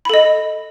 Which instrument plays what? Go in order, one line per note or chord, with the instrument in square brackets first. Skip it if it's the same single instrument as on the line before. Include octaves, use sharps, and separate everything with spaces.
[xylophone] B5
A4
D#5